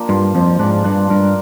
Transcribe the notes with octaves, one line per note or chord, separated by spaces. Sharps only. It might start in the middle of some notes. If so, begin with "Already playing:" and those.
Already playing: F3 A#3 D4
G2 F4
F2 F3
G#2 D4
G2 D4
G2 A#4